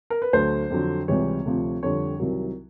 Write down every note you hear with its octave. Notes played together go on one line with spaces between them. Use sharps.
A#4
B4
D2 D3 F#3 C5
F2 D3 F#3
C#2 C3 E3 G3 C#5
D2 C3 F3
F2 D3 G3 C#5
C2 C3 D#3 F#3